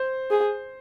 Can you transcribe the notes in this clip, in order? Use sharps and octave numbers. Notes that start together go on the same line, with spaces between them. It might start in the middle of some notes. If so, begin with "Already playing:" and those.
Already playing: C5
G#4